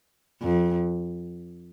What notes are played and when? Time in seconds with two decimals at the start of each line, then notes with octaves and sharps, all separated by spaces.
0.42 F2